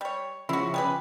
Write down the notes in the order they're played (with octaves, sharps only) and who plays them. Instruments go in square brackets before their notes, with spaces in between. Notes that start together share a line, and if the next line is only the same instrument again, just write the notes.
[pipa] G3 C#5
[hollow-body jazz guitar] C#3 F3 [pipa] E4 F#4
[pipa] G3 G#4 B4